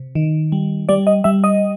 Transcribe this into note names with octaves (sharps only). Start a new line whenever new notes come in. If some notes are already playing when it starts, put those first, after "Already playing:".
Already playing: C3
D#3
G3
G3 D5
D#5
G3 E5
D#5